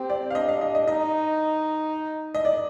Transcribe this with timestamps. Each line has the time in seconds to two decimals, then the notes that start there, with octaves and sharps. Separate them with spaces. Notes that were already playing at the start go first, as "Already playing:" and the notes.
Already playing: C4 G4
0.10 D5
0.30 F5
0.35 D4 D#5
0.48 F5
0.61 D#5
0.75 D#5
0.88 D#4 D#5
2.35 D#5
2.45 D5